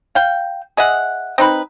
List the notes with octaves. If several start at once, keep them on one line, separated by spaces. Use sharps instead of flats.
F5 G5
G#4 D#5 E5 F#5
C4 D#4 B4